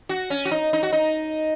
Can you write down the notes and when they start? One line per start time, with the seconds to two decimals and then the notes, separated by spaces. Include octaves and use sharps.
0.09 F#4
0.30 C#4
0.45 F#4
0.51 D#4
0.73 D#4
0.83 F#4
0.93 D#4